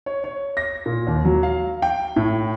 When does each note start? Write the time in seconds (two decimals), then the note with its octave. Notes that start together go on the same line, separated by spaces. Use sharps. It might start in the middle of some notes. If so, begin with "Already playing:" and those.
0.06 C#5
0.24 C#5
0.57 A#6
0.86 A#2
1.07 D#2
1.25 F#3
1.43 F5
1.82 G5
2.16 A2